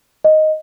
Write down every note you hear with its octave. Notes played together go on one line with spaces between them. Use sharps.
D#5